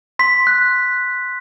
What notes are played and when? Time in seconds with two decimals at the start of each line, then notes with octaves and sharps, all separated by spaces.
0.19 C6 B6
0.47 F#6